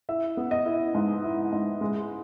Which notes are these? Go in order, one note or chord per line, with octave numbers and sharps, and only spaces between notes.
E4 E5
B3
D#5
E4
G#2
E4
G#2
G#3